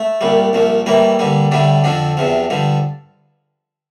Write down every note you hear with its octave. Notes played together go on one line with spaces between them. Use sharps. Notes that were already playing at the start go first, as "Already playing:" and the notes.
Already playing: A3
C2 A#2 G3
C2 A#2 F3
A2 E3 G3 A#3
G2 D3 G3
A2 D3 G3 D4
F2 D3 F3 D4
E2 C3 F3
G2 D3 F3